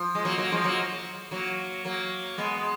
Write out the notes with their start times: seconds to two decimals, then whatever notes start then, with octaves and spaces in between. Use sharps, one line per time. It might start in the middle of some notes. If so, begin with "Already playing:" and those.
Already playing: F3
0.15 G#3
0.25 F#3 A#3
0.38 F#3 A#3
0.52 F3 G#3
0.64 F#3 A#3
1.31 F#3 A#3
1.85 F#3 A#3
2.38 G#3 B3